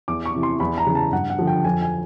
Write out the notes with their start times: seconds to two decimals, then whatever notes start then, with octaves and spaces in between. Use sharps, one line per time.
0.08 E2 D6
0.26 C#6
0.34 C3 E3
0.43 C6
0.60 E2 B5
0.78 A#5
0.86 C#3 E3
0.95 A5
1.13 G2 F#5
1.30 F#5
1.39 D3 F3
1.47 G5
1.64 F2 G#5
1.82 G#5